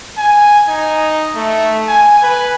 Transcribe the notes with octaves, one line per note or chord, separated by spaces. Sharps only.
G#5
D#4
A3
G#5
B4